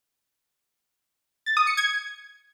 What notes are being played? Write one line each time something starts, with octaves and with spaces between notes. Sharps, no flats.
A6
D#6
C#7
G#6